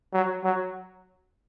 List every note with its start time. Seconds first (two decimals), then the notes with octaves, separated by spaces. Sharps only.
0.13 F#3
0.44 F#3